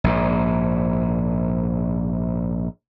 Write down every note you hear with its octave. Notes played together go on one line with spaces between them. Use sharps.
A#1 G#2